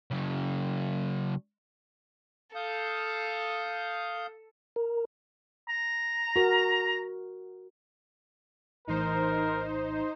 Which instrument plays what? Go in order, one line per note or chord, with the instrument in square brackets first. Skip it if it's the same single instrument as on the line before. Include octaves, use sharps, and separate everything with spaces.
[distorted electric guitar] C#3 F#3
[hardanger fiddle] A4 [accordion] F5 D#6 G6
[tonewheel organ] A#4
[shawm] A#5
[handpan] F#4 A#4
[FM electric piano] A#1 A2 E3 [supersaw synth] D#4 C5 [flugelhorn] A#4